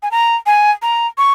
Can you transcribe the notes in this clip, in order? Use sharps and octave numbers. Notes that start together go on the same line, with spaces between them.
G#5
A#5
G#5
A#5
C#6